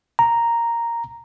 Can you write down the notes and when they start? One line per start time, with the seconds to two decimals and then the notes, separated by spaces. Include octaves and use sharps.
0.19 A#5